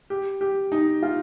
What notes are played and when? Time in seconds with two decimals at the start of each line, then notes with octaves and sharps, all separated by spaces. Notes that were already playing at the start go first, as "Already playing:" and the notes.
0.10 G4
0.41 G4
0.72 D#4
1.03 F4